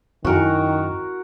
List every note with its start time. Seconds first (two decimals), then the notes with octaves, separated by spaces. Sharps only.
0.25 F#2 D#3 E4 F#4 A#4 G#5